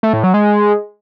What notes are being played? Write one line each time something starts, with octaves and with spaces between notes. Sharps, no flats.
A3
A2
F#3
G#3